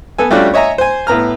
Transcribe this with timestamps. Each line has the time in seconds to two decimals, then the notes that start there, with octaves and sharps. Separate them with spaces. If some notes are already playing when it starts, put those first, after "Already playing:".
0.18 B3 A4 G#5
0.31 G3 A3 C#4 D4 F4 F#4
0.54 C#5 D#5 E5 G#5 A#5
0.78 C5 G#5
1.07 A2 B3 A#5 F6